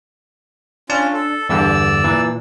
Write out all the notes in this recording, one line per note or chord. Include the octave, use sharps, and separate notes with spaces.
C#4 D4 F4 A5
A4
E2 G2 D3 D5 E6
A#2 E3